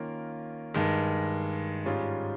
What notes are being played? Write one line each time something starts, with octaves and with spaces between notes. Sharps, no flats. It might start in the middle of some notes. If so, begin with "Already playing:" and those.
Already playing: D#3 A#3 C#4 F4 A#4
G2 D#3 G#3
G#2 G3 C#4 F4 G#4